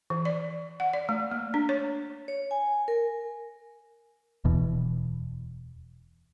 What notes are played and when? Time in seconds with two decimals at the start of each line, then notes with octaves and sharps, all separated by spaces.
0.10 E3
0.25 D5
0.80 F#5
0.93 D5
1.09 A3
1.31 A#3
1.54 D4
1.69 C#5
2.28 C#5
2.51 G#5
2.88 A#4
4.44 D1 E2 B2